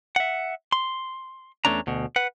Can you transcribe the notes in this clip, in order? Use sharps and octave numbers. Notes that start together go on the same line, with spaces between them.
E5 F#5
C6
E2 B2 A3 C#4 D4 A#5
D2 B2
B4 F#5